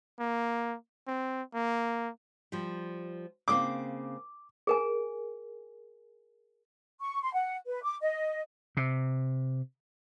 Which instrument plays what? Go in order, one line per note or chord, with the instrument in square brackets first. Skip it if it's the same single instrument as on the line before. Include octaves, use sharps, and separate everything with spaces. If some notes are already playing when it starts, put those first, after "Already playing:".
[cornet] A#3
C4
A#3
[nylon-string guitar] F3 G3
[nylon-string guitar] C#3 A#3 C4 [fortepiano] D6
[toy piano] G#4 A#4 G#5
[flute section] C#6
C6
F#5
B4
D6
D#5
[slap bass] C3